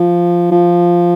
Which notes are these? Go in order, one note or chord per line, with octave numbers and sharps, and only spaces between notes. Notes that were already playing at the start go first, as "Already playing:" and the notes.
Already playing: F3
F3